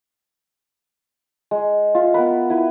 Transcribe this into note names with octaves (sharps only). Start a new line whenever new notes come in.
G#3
F4 E5
B3 A#4 B4
E4 B4